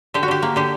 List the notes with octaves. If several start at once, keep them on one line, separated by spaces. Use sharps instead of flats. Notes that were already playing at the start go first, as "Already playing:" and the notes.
D3 G4
F#4
D3 G4
A#3
D3 G4